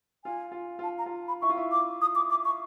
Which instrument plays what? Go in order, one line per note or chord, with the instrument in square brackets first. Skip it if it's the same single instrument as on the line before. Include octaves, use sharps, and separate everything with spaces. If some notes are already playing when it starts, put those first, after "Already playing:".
[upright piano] F4 [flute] G#5
[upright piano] F4
[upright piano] F4 [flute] A5
[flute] A#5
[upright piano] F4
[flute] B5
[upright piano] E4 [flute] C#6
[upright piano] F4
E4
[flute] D6
D#6
D6
D6
C#6